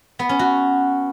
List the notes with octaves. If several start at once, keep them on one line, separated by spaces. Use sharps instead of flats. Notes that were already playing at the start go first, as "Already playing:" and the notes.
B3
C#4
F#4